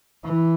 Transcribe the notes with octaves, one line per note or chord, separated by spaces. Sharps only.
E3